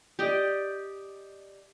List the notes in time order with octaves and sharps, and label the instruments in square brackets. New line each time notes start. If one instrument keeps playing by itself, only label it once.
[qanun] G4 D5 D#5